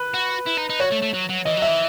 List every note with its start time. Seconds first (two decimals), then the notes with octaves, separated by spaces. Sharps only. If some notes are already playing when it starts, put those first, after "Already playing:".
Already playing: B4
0.14 F#4
0.47 E4
0.58 D#4
0.69 D#4
0.80 F#4 C#5
0.91 A3
1.02 A3
1.13 F#3
1.29 F#3
1.45 E3 D#5
1.57 F#3
1.62 E5
1.68 E3